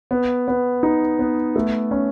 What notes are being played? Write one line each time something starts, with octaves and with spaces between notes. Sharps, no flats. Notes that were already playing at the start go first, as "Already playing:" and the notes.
B3
B3
D#4
B3
A3
C#4